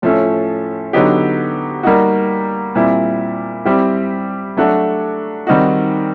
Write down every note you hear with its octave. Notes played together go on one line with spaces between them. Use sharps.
A2 F3 A3 C#4
D3 F#3 B3 D#4 G4
G3 A#3 D#4 F#4
A#2 G3 C4 E4
G3 C4 E4 G4
F#3 A3 D4 F#4
D#3 G3 C4 D#4 F#4